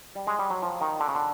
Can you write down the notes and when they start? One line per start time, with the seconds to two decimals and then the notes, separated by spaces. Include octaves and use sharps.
0.15 G3
0.27 G#3
0.39 G3
0.50 F#3
0.63 F3
0.81 D#3
1.00 D3
1.08 C#3
1.15 D3